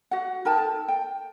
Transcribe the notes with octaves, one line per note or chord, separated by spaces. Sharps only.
F#4 F#5
D#4 A#4 G5 A5
A4
G5